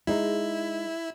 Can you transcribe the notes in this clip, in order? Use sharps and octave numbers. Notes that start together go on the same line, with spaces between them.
G#3 D#4 E4